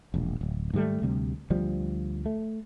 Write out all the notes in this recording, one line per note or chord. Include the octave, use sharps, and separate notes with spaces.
E1 A#1
D1
G#2 D#3 G3 A3
D2 C3 G3
D2 F3 G3
A3